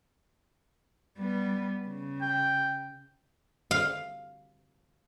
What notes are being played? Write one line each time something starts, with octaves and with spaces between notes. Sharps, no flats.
G3 B3
C#3
G5
F5